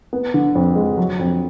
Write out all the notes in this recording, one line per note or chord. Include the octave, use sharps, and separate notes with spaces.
B3
D3
F2
G#3
F#3
F2